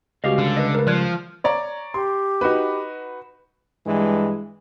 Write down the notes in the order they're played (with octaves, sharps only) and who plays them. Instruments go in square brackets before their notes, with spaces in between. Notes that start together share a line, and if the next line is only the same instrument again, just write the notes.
[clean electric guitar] C#2 G3 F5 [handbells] F#4 G4 D#5
[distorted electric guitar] D3
[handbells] B4 D#5
A#4 B4
[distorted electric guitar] F3 [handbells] D5 F#6 G#6
[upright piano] C#5 D5 A#5
[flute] G4 [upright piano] C6
[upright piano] D#4 F#4 B4
[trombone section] G2 E3 G#3